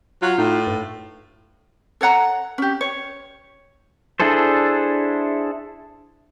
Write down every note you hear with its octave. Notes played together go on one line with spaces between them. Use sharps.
F#3 F4
A2 D#4
G2
A4 C#5 F#5 A#5
C#4 G4
C#5
D4 E4 G#4 A4 C5